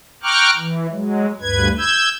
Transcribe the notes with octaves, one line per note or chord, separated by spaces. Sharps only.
G5 A#5 C#6 D6 F6 F#6
E3
F#3 G#3
D2 G2 B4 G#6
E6 G6 G#6